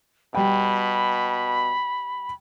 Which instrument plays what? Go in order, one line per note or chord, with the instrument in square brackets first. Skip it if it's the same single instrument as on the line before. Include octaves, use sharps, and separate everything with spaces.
[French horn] B2 [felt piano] G3 G5 [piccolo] B5